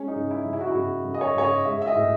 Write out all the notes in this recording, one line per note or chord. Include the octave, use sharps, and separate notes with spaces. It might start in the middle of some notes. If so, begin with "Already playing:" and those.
Already playing: G#3 C#4
D#4
C#3
E4
C#3
E4
F#4
E4
C#3 F#4
C#3
D#5
C#5
C#3 C#5
D#5
G#3 E5
E5
D#5
A2